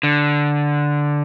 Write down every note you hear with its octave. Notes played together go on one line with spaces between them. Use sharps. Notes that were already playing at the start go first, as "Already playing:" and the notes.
D3